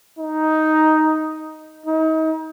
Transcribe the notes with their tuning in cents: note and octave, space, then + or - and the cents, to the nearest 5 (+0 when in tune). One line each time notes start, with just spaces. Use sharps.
D#4 +5
D#4 +35